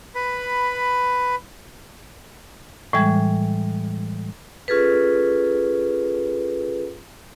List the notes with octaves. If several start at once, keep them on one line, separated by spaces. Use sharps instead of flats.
B4 B5
A2 E3 G3 G#3 G#6
C#4 F4 G#4 A4 B4